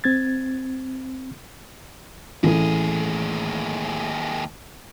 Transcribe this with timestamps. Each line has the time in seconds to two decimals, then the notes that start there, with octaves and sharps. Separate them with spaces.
0.04 C4 G#6 A6
2.43 A1 D#2 A2 G#4